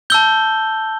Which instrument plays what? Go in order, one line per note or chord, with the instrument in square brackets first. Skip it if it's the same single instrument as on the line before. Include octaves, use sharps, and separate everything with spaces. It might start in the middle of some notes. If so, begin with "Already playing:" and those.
[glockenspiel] A5 E6 G6 G7